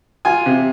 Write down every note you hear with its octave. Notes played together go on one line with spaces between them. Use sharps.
F4 G#5
C3